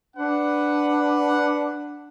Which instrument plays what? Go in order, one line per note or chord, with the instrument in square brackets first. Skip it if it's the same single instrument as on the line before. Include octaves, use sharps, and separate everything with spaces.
[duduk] D4 [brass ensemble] B4 F#5